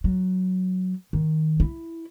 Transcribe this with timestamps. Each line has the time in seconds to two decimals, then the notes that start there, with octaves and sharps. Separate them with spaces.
0.04 F#3
1.13 D#3
1.60 E4